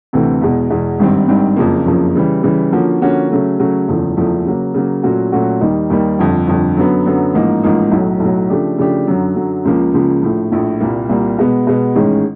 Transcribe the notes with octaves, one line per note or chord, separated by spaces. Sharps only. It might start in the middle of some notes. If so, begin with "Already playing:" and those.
D2 C3 E3 A3 C4
E2 B2 G#3
E2 B2 G#3
G#1 G2 D#3 G3 C4
G#1 G2 D#3 G3 C4
F#1 F2 C#3 F3 A#3
F#1 F2 C#3 F3 A#3
C#3 E3 G3
C#3 E3 G3
D3 F3 A#3 C#4 F#4
D3 F3 A#3 C#4 F#4
C#3 F#3 A3 C#4
C#3 F#3 A3 C#4
F#1 E2 C#3 F3 A3
F#1 E2 C#3 F3 A3
C#3 F#3 A#3
C#3 F#3 A#3
A#2 F#3 A3 C#4 F#4
A#2 F#3 A3 C#4 F#4
D#2 D#3 G3 A#3 D#4
D#2 D#3 G3 A#3 D#4
G1 F2 D3
G1 F2 D3
F#2 D3 F#3 B3
F#2 D3 F#3 B3
A1 G#2 F3 A#3 D#4
A1 G#2 F3 A#3 D#4
B1 A2 F#3
B1 A2 F#3
C#3 F3 A3 D4 G4
C#3 F3 A3 D4 G4
F#2 D3 F#3
F#2 D3 F#3
C#2 C#3 F3 A#3
C#2 C#3 F3 A#3
A#1 A2 F3
A#1 A2 F3
C2 A#2 G3 A#3
C2 A#2 G3 A#3
B2 G#3 B3
B2 G#3 B3
A1 G#2 D#3 G#3 C#4